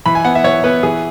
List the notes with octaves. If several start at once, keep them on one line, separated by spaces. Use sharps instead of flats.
E3 B5
G#5
B3 F#5
E5
E3 C#5
B3 B4
E3 G#4